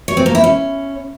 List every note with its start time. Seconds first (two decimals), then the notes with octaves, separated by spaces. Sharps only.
0.08 C#5
0.17 C4
0.26 A#3
0.35 E4
0.44 C#4